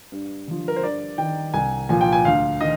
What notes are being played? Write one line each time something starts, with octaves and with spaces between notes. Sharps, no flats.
G2
D3 F3
A#4
C5
G2 D5
D#3 G5
C2 G#5
A#2 F3 G#5
G5
G#5
D2 F5
D#3 D#5